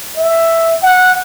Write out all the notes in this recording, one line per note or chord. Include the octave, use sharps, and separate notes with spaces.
E5
F#5